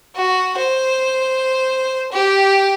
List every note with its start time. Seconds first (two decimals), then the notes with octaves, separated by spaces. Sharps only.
0.16 F#4
0.58 C5
2.12 G4